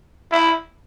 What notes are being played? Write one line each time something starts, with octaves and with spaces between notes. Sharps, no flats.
E4